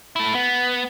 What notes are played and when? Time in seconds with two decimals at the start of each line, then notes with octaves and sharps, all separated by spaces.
0.16 A3 E4
0.34 B3